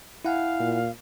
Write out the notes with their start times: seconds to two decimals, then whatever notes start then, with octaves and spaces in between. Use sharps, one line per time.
0.25 E4 F5 F#5 G#5
0.60 A#2